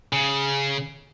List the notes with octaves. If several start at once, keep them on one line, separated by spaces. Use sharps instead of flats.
C#3